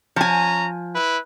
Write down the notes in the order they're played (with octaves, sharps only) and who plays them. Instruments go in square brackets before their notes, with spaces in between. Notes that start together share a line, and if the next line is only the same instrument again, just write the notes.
[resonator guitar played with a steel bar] F3 G#5 [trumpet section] C#4 A#5
[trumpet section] E4 B4